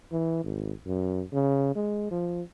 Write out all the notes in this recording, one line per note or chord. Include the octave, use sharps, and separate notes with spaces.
E3
G#1
F#2
C#3
G#3
F3